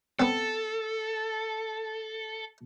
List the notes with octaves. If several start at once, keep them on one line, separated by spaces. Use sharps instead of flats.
B3 C4 A4